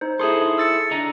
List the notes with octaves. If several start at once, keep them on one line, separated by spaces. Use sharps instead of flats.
D#4 C5
E4 G#4 A4 C6 D#6
E6 A6 C#7
D3 D#5 A#5